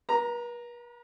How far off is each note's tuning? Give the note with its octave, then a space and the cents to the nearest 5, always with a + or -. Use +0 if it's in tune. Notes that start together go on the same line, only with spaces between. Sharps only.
B4 -45 A#5 +0